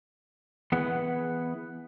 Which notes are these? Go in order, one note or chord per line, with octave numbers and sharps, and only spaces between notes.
E3 B3 G#4 B4 F#5